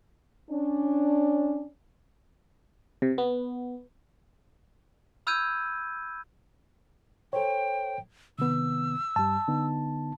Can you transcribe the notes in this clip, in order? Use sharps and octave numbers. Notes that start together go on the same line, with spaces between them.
C#4 D4
C3
B3
B5 E6 F6 G6 G#6 D#7
A4 C5 C#5 G5
C3 D#3 B3 E6
G2 G3 A5
D3 B3 D#4